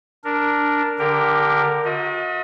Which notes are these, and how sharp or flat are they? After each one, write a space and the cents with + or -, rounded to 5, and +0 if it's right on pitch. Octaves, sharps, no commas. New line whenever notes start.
D4 +0 A#4 +0
D3 +0 G4 +15 A#4 +0
F#4 -45 D#5 +35